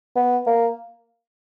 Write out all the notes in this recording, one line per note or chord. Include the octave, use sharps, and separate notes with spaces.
B3
A#3